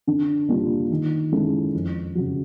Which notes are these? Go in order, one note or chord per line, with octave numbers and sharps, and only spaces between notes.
D3
G3 A#3 D4 F4
D#3
G#3 C#4 E4 A4
F2
C#3 F#3